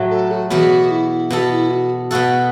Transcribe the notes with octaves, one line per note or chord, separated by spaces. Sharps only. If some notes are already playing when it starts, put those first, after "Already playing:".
Already playing: A2 F#3 A3
A4
F#4
E2 B2 B3 F#4
E4
B2 B3 F#4 A4
E4
F#4
B2 B3 F#4 A4